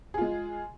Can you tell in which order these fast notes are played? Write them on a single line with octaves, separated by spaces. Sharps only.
G#4 F4 G#3